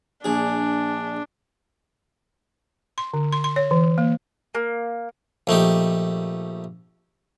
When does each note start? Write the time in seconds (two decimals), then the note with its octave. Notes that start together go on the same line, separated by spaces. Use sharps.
0.24 A#1 D4 G#4
2.98 C6
3.14 D3
3.33 C6
3.44 C6
3.56 C#5
3.71 E3
3.98 A#3
4.55 A#3
5.47 A#1 A3 D#4 G4